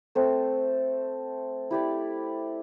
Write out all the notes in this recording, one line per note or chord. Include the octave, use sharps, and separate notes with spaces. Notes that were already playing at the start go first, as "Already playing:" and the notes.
A3 C4 A4 C5
E4 G4 D5